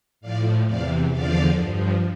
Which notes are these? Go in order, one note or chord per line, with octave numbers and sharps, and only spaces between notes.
A2 F3 D5 F5
E2 C3 E3 D5 F5
E2 D3 F3 D5 F5
G2 F3